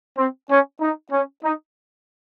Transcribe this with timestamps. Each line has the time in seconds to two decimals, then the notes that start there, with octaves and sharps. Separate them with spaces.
0.18 C4
0.50 C#4
0.81 D#4
1.11 C#4
1.44 D#4